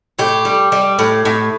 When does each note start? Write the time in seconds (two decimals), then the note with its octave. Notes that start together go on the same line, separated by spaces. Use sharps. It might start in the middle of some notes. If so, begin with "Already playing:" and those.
0.19 A2 G4
0.45 G3
0.72 G3
0.99 A2
1.25 A2